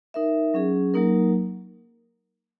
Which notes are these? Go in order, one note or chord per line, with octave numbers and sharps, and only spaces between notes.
D#4 A#4 E5
F#3 C#4 G#4
F#3 A#3 D#4 A#4